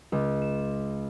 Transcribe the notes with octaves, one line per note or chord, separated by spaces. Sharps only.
C#2
E7